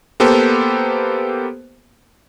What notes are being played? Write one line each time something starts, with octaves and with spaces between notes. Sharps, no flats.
A#3 B3 G4 A4 C5